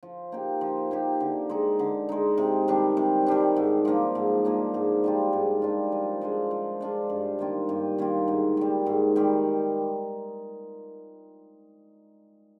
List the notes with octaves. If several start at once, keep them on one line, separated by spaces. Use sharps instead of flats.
F3
A#3 D#4 G4
F3
A#3 D#4 G4
D3
G#3 D#4
D3
G#3 D#4
C3
D#3 G3 D4
C3
D#3 G3 D4
G#2
F3 A#3 D4
G#2
F3 A#3 D4
G#2
G3 D4 F4
G#2
G3 D4 F4
F3
G#3 D4 F4
F3
G#3 D4 F4
G2
D#3 A#3 F4
G2
D#3 A#3 F4
G#2
D#3 G3
G#2
D#3 G3